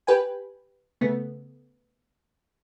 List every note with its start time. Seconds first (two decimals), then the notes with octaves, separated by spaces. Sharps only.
0.07 G4 B4 G5 G#5
1.01 C#3 A3 B3